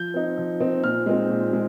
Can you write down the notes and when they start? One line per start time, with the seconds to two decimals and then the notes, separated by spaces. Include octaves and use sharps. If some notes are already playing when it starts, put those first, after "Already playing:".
Already playing: F3 G6
0.14 C4 D#4
0.37 F3
0.60 C4 D#4
0.83 A#2 F6
1.06 G#3 C4 D#4
1.30 A#2
1.53 G#3